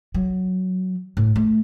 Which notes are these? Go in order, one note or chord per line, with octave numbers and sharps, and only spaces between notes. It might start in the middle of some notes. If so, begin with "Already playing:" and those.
F#3
A2
A3